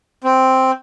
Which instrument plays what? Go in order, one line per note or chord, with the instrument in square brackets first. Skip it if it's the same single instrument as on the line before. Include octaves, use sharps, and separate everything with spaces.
[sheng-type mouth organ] C4